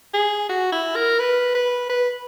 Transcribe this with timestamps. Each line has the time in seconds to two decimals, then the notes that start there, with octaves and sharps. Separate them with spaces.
0.14 G#4
0.49 F#4
0.72 E4
0.96 A#4
1.19 B4
1.55 B4
1.89 B4